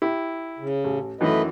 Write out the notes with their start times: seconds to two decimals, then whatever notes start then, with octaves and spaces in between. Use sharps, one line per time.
0.02 E4 G4
0.59 C#3
0.84 A1
1.21 F#2 D#3 E3 A3 B4 D#5